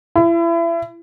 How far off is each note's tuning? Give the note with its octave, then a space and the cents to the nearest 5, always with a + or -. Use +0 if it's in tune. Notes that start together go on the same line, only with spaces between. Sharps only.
E4 +35